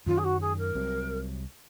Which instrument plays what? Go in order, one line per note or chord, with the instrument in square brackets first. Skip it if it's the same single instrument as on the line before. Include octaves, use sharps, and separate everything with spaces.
[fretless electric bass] F#2 D#3 F#3 C#4 [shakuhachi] F4
[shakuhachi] G#4
F#4
G#4
A#4
[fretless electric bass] C2 C3 F#3